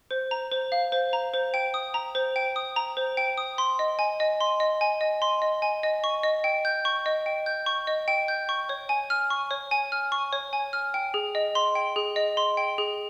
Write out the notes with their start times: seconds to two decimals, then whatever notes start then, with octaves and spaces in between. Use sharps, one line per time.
0.11 C5
0.31 A#5
0.52 C5
0.72 F5
0.92 C5
1.13 A#5
1.34 C5
1.54 G5
1.74 D#6
1.94 A#5
2.15 C5
2.36 G5
2.56 D#6
2.76 A#5
2.97 C5
3.17 G5
3.38 D#6
3.58 C6
3.79 D#5
3.99 G#5
4.20 D#5
4.41 C6
4.60 D#5
4.81 G#5
5.01 D#5
5.22 C6
5.42 D#5
5.62 G#5
5.83 D#5
6.04 C#6
6.23 D#5
6.44 G5
6.65 G6
6.85 C#6
7.06 D#5
7.26 G5
7.46 G6
7.66 C#6
7.87 D#5
8.08 G5
8.28 G6
8.49 C#6
8.69 C#5
8.89 G#5
9.10 F6
9.30 C#6
9.51 C#5
9.71 G#5
9.92 F6
10.12 C#6
10.33 C#5
10.53 G#5
10.73 F6
10.94 G5
11.14 G#4
11.35 D#5
11.55 C6
11.75 G5
11.96 G#4
12.16 D#5
12.37 C6
12.57 G5
12.78 G#4